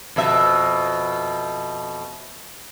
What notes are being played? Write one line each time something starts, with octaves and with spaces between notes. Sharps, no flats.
F2 B2 E5